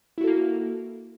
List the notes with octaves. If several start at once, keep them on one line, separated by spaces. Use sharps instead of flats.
A#3 E4 F#4 A4